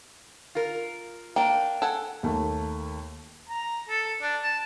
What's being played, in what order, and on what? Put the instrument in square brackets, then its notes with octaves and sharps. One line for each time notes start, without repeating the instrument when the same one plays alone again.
[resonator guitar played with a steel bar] F4 A#4
[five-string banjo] A#3 D4 [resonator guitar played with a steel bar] G5
[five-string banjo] A4 F#5 G#5
[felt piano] D#2 A3 A#3
[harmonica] A#5
A4
D4
A5